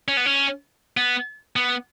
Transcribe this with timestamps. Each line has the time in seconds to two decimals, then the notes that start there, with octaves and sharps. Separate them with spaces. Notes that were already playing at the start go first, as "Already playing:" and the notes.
0.08 C#4
0.17 B3
0.26 C#4
0.97 B3
1.56 B3